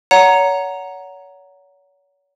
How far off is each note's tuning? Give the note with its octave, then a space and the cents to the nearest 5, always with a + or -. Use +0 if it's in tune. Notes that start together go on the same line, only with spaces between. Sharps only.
C#5 +35 F#5 +0 A#5 +0